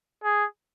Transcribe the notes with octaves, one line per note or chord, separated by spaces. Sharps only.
G#4